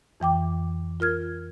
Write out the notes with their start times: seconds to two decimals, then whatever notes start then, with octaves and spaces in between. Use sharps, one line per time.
0.20 F2 E3 G5 D6
1.00 F4 A#4 F6 G#6